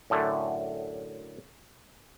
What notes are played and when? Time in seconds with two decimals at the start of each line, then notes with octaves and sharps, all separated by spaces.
0.10 F#2 A2 D3 A3